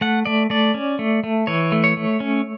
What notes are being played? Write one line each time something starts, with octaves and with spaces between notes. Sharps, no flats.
A3 F#5
A3 D5
A3 D5
C#4
A3
A3
E3 C#5
A3
C#5
A3
C#4